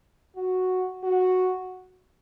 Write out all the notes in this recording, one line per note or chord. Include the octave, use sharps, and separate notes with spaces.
F#4
F#4